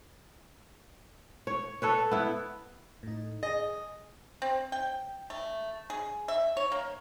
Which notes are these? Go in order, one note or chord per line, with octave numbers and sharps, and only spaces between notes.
C#5
A4 B4 C#5
B3 E4
A2 D#4
G#4 D#5
C4
G5
A3
G#4
E5
C#5
A#3